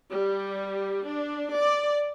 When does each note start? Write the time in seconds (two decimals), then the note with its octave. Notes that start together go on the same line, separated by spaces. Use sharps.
0.11 G3
1.07 D4
1.56 D5